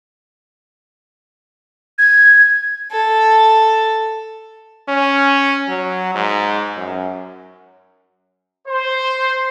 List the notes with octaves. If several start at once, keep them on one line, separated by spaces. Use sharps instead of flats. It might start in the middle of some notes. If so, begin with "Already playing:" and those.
G#6
A4
C#4
F#3
G#2
F#2
C5